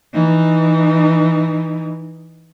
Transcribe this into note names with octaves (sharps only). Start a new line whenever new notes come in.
E3 D#4